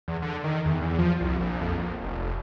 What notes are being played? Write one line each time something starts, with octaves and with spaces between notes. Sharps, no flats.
E2
D3
D#3
E2
E2
F3
C2
A#1
F2
A#1
F1
F1